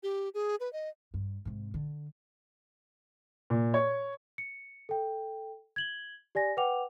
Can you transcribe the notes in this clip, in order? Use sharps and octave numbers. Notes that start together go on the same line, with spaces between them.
G4
G#4
B4
D#5
G2
G#2 C3
D3
A#2
C#5
C#7
A4 G5
G#6 F#7 G7
G4 D5 G#5 A#6
B4 F#5 G5 D6 F7